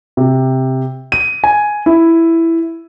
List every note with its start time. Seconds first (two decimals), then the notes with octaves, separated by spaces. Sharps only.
0.17 C3
1.12 D#7
1.44 G#5
1.86 E4